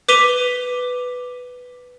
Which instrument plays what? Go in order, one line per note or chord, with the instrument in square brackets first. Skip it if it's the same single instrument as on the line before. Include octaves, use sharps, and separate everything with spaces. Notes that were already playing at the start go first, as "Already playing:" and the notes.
[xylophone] B4 D6 B6 D#7 F7 G7